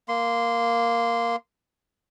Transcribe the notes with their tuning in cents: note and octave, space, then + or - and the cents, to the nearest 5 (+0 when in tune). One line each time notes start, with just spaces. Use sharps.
A#3 +0 C6 -15